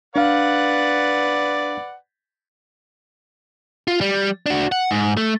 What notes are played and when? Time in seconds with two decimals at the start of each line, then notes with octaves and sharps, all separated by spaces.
0.16 D4 B4 D5 F5 F#5
3.88 F4
4.01 G3
4.46 D4 F#4
4.72 F#5
4.91 G#2
5.17 A3